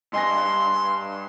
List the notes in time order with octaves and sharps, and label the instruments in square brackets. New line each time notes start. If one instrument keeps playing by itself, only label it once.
[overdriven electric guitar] G2 [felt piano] D#5 G#5 A#6 [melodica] C6